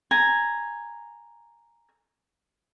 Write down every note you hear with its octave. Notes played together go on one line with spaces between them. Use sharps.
G#5 A#5